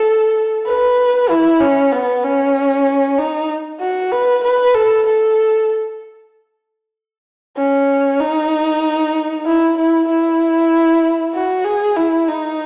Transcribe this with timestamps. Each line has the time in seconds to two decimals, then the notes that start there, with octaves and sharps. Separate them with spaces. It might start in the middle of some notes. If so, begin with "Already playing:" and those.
Already playing: A4
0.67 B4
1.30 E4
1.60 C#4
1.92 B3
2.24 C#4
3.18 D#4
3.80 F#4
4.12 B4
4.44 B4
4.74 A4
5.06 A4
7.57 C#4
8.20 D#4
9.46 E4
9.77 E4
10.08 E4
11.33 F#4
11.65 G#4
11.96 E4
12.28 D#4